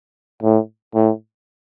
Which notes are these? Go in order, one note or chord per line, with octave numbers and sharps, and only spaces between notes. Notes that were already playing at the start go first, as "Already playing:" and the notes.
A2
A2